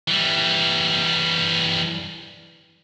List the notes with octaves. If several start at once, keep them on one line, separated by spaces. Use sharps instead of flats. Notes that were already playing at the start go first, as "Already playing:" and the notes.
E3 G3